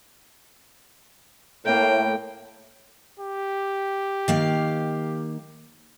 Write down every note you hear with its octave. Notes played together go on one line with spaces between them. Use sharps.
A2 A#3 G5
G4
D#3 A#3 F5